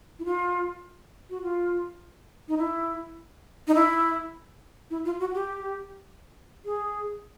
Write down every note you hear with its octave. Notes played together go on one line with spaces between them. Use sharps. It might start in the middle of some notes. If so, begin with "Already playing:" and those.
E4
F4
F#4
F4
D#4
E4
D#4
E4
E4
F4
F#4
G4
G#4